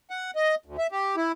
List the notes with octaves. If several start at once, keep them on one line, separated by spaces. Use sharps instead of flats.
F#5
D#5
D2
E5
G4
E4